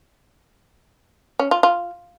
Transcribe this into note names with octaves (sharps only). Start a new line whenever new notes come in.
C#4
F4
F4